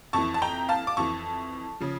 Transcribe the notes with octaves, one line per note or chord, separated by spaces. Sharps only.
F2 E3 A5 C#6
A5
G5 A#5
F5 A5
D6
F2 E3 A5 C#6
C#3 F3